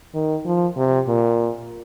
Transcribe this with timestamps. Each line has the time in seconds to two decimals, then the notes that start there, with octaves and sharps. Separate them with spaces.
0.14 D#3
0.45 F3
0.77 C3
1.08 A#2